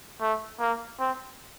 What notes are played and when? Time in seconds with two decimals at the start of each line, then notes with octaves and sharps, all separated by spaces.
0.21 A3
0.60 A#3
1.00 C4